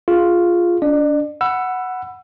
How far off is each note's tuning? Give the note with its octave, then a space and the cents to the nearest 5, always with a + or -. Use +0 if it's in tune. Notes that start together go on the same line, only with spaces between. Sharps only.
F4 +0 G#4 +0
D4 -30 D5 +40
F#5 +0 B5 +0 E6 +20